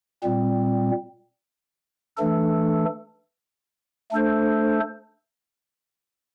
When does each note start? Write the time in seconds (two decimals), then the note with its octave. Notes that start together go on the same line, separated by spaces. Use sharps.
0.23 A#2 G3 C4
2.17 E3 A3 D4 A4
4.12 A3 D4 A4 C5